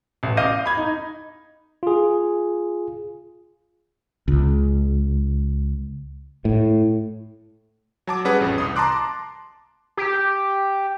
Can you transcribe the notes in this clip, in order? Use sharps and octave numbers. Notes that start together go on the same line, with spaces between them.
A1
D#5 F5 D6 G6 A#6 D#7
B5 G#6
D#4
F4 G#4
C#2
A2
F#3 A5 D6
G3 C#4 G#4 B4 F#5
A1 F2
C2 D#6
A5 A#5 C6 D6 F#6
G4